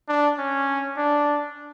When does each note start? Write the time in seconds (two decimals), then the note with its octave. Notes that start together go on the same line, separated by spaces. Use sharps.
0.09 D4
0.38 C#4
0.97 D4